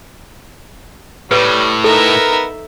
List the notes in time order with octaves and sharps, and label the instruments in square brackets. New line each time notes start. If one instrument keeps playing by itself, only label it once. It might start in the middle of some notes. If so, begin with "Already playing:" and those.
[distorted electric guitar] A2 [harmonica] G3 [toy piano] B4
[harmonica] B3 A#4 [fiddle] D#4 E5 [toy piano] A4